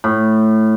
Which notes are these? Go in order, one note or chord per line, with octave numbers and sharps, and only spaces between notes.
A2